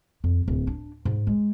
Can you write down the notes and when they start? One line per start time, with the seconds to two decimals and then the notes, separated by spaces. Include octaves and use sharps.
0.24 F2
0.48 D1
0.67 D4
1.05 G#2
1.27 G#3